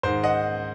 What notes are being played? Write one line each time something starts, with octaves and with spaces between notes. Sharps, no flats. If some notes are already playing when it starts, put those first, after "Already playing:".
G#2 D#3 C5
D#5 F#5